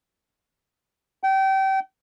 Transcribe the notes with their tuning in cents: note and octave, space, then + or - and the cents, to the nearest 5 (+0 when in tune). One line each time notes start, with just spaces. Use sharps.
G5 -30